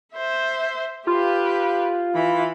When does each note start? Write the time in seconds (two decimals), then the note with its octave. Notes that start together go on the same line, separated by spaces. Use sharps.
0.14 C5 E5
1.07 F4 G4 B4
2.15 E3 B5